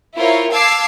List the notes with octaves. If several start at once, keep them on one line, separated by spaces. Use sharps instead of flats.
E4 F4 A#4 C5 C#5
F5 A5 D6 E6 G#6 C7